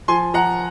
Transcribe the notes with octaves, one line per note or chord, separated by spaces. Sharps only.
F3 G#5 C6
F3 F#5 A#5